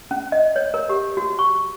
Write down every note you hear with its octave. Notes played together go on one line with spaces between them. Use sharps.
C#4
D#5
C#5
A#4
G4
F#4
C#6